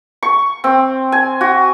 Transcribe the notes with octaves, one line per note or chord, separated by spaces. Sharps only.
C#6
C4
G#5
F#4